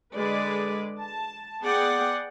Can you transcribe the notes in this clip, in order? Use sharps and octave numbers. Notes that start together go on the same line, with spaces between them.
D3 G#3 B4 D5
A5
B3 G#4 D5 F#5 G5